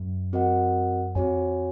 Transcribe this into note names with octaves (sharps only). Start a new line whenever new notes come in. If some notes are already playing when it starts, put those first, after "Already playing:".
Already playing: F#2
C4 F#4 A#4 D#5 F#5
F2 C4 F#4 C#5 G#5